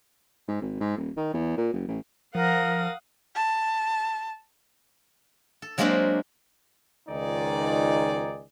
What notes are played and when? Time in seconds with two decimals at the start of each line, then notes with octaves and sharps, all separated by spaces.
0.48 G#2
0.62 G#1
0.80 G#2
0.97 D#1
1.17 D#3
1.33 E2
1.57 A#2
1.73 F#1
1.88 A1
2.35 F3 A#4 F5 F#5 D#6
3.35 A5
5.62 A4
5.78 F#3 G#3 A#3 C4 D4 G4
7.09 C#2 D#3 F3 D#4 G#4 D5